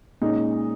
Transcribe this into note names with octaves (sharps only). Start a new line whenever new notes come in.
A#2 G#3 C#4 D#4